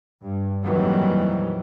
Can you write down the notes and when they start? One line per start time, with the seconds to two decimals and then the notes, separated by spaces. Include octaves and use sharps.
0.22 G2
0.64 F2 A#2 D#3 E3 F#3 G3